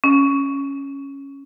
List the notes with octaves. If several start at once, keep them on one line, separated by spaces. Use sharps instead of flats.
C#4